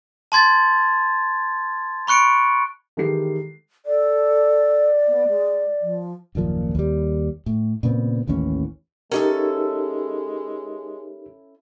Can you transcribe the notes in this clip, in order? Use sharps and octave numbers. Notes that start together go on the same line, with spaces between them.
A5 C6 G#6 A6
B5 C#6 F#6 C#7 D7
D#3 E3 G#3 G4 A4 C7
A4 D5
B3
G#3
F3
F#1 D#2 A#2 F3
D#2 G3
A2
A#2 C#3 B3 C4
A1 D#2 E3 C#4
G#3 C#4 D#4 E4 G4 A4 A#4